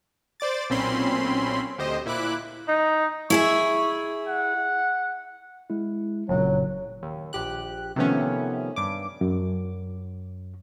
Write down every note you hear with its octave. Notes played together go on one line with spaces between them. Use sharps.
C5 D5 D6 A6
B1 A#2 C4 C#4 B5 C6
D2 G4 C5 D#5
A#2 E4 B5 D6 F#6
D#4
E4 G#4 E5 C#6
F#5
G#3 E4
F#1 F2 A#2 C#3 F#3
D#2
A#1 G4 F#6
C3 D#3 F3 A3 B3 C#4
G2 D6
F#2